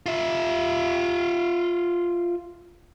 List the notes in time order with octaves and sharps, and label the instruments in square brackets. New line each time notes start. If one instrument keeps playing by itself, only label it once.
[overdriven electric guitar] F4 E5